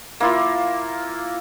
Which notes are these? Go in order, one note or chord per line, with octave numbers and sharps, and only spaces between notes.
A#3 E4 F4